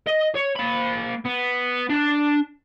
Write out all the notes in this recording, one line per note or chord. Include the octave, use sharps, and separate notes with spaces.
D#5
C#5
A#3 B5
B3
D4